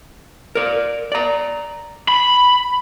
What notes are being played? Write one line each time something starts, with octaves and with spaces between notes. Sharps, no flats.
A#4 D5
D5 A#5
B5